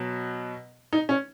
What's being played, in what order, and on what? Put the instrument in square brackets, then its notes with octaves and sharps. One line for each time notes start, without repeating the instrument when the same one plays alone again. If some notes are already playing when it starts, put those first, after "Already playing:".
Already playing: [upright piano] B2 F#3
D#4
C#4